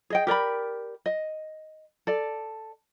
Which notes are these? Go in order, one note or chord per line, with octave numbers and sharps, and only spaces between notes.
G#4 D#5 G5
G4 A#4 D5 B5
D#5
A4 D5